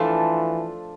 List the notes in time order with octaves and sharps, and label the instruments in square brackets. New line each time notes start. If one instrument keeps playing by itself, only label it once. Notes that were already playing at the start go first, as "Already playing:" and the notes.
Already playing: [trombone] E3 [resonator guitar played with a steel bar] F3 A3 D4 F4 A4